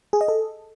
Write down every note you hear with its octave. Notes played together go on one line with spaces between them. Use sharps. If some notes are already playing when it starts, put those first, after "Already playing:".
G#4
D#5
A4